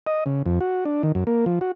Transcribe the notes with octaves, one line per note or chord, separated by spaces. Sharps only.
D#5
C#3
F2
F#4
D4
D#3
F#2
A#3
F3
F#4